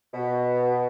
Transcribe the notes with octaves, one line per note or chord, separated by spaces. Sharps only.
B2